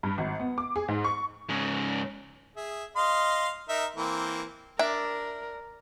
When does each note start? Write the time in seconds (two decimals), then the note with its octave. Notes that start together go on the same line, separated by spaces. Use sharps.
0.03 G2
0.18 G#1
0.40 B3
0.58 D6
0.76 G#4
0.88 G#2
1.04 C#6
1.49 G#2 C#3
2.56 G#4 E5
2.96 D#5 F5 C6
3.69 D#4 A#4 E5
3.96 E3 A#3 C4
4.79 D4 A#4 E5